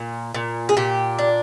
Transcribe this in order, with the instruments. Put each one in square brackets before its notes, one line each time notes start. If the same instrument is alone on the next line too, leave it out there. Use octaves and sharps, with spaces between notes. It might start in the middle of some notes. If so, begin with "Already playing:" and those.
Already playing: [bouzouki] A#2
A#2
G#4
A#2 G4
D4